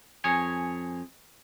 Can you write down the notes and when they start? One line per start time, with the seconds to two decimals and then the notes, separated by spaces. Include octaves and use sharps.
0.24 F2 G#4 C#5 G#5